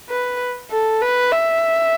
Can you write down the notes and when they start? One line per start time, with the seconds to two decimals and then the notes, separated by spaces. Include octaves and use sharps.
0.09 B4
0.71 A4
1.01 B4
1.31 E5